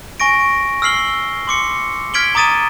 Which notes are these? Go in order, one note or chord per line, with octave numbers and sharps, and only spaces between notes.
G#5 C#6 A#6 D7
E6 F6 C7 F#7 G7
C6 D6 C#7
F6 G#6 B6 D7 F#7 G7
A#5 D6 D#6 A6 D#7 E7